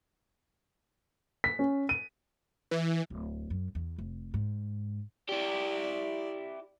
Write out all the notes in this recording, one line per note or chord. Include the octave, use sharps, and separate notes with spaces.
B6
C#4
D#7
E3
D1
F#2
E2
F1
G#2
E4 G4 D5